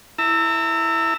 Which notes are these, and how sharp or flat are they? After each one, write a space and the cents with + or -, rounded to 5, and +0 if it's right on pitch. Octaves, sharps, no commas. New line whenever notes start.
E4 +0 A#5 -45 E6 +0